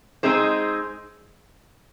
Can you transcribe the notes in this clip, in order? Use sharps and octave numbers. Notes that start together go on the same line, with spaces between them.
G#3 C4 D#4 G#4 C5